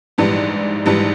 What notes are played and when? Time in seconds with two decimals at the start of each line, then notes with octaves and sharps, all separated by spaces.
0.18 A#1 G#2 E3 G3
0.86 A#1 G#2 E3 G3